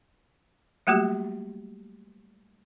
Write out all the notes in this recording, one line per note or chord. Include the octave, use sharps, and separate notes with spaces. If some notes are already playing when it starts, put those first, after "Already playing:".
F#3 G3 A3 A#3 F#4 G4